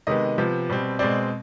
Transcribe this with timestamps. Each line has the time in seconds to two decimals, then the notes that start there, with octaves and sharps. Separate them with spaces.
0.07 C3 D#3 G#3 B3 D#5
0.38 C3 F3 B3
0.69 B2 G3 C4
0.99 B2 G#3 C4 D5